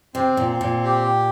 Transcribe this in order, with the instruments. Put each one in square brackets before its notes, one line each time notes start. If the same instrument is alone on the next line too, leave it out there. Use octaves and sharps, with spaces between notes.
[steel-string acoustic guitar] C3 [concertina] C4
[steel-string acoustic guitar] A#2
[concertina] C4
[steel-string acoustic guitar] A#2
[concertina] G4